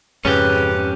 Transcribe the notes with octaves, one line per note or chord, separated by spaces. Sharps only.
F2 G#2 C#3 C#4 G4 B4